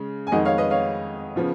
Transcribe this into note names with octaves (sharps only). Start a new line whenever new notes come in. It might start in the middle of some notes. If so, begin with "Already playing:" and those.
Already playing: C#3 G#3
G#5
F2 D#3 G#3 D#4 D#5 F#5
C#5 F5
B4 D#5
C#5 F5
C#3 F3 B3